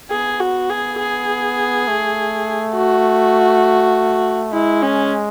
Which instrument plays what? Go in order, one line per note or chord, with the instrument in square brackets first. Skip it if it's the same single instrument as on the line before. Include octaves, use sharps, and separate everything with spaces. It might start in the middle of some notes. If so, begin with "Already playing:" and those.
[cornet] B3 [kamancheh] G#4
[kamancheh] F#4
G#4
G#4
[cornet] A3
[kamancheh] F#4
[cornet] G#3 [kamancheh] E4
[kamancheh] C#4